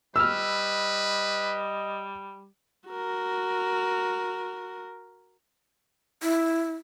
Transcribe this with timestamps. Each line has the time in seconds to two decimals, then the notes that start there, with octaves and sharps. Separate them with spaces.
0.16 G3 B4 D#5 E6 F6
2.89 F#4 A#4
6.23 E4